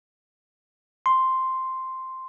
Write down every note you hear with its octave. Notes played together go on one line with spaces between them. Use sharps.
C6